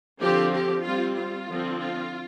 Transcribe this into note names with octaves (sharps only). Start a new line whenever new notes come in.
D3 F3 C4 G4
G4
G3 C4 F4
F4
D3 F3 C4
F4